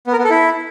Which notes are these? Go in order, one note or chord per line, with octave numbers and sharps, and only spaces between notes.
B3
A#4
B3
A4
E4